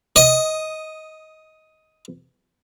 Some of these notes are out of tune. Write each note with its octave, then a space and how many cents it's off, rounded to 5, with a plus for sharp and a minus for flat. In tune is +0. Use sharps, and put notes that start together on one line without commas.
D#5 +15 D#6 +0